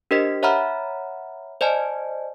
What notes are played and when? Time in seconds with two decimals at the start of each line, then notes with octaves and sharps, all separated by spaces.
0.11 D4 G4 A#4 C5 D#5 B6
0.43 C#5 E5 F#5 A#5 B5 F6
1.61 C5 D5 D#5 G#5 A5